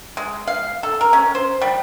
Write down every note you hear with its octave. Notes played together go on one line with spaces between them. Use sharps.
G#3
F5
A4
A#4
C#4
C5
G3